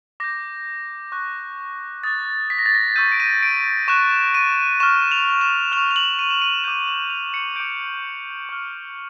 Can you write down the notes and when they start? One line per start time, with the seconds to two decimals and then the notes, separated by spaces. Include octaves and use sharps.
0.20 D6 G6 A#6
1.12 C#6 F#6
2.04 D#6 F#6 A6
2.50 B6
2.59 A#6
2.66 A6
2.75 A#6
2.96 C#6 E6 G6 D#7
3.12 D7
3.20 D#7
3.43 D7
3.88 C#6 F#6 E7
4.35 D#7
4.80 C#6 F6 E7
5.12 F7
5.41 E7
5.72 C#6 F6 F7
5.91 F7
5.96 F#7
6.19 D#7
6.30 E7
6.42 D#7
6.64 D6 G6 E7
6.88 F#7
7.10 F7
7.34 C#7
7.56 D6 G6 D7
8.49 C#6 F6